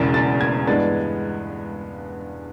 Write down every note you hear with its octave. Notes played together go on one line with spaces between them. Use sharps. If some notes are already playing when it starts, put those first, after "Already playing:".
Already playing: E1 E2 C#3 E3 A6
A6
G#6
G2 E3 G#3 B3 D4 A6